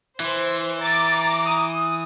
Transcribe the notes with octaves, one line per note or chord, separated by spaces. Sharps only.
E3 C5
A#5 D6 A6
D#6